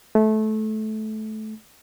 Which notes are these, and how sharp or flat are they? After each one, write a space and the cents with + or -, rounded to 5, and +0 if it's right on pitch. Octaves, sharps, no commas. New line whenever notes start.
A3 -20